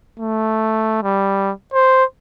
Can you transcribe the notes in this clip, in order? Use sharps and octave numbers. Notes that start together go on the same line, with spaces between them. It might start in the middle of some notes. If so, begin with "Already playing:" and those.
A3
G3
C5